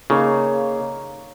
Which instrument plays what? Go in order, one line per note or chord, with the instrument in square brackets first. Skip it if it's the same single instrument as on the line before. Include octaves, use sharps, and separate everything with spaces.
[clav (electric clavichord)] C#3 [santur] A#3 D#4 C#5 F5